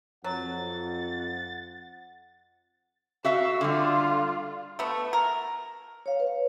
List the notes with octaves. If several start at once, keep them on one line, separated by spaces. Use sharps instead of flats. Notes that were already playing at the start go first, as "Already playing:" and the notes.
F2 F#3 F#5 A6
F#4 E5 F5 E6
D3 G3 F4
A3 B3
A#4
C#5 F5
B4